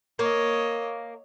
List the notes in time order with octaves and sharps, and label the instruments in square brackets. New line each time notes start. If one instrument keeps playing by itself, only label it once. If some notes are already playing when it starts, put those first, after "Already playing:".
[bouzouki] A#3 [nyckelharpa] C#5 D#5